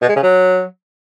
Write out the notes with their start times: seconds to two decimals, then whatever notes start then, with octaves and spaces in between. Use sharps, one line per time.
0.02 B2
0.09 G#3
0.16 C#3
0.23 F#3